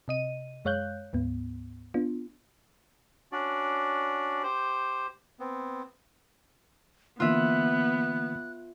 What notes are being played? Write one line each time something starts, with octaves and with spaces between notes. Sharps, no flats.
C3 D#5 D#7
F#2 G#3 C#5 F5 F#6 G6
D2 G#2 B3
B3 D4 F4
C#4 D4 F#4 D5
G4 C5
B3 C4
D3 E3 A#3 B3 F4 E5 F#6